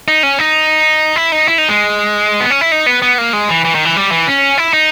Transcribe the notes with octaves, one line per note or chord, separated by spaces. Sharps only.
D#4
C#4
D#4
E4
D#4
E4
D#4
G#3
B3
C#4
E4
D#4
B3
B3
A#3
G#3
E3
E3
D#3
E3
G3
E3
C#4
E4
D#4